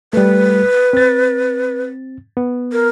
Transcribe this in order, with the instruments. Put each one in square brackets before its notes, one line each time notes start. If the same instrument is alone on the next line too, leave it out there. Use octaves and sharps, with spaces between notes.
[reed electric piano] G3 A3 [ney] B4
[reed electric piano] C4 A6
B3
[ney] A#4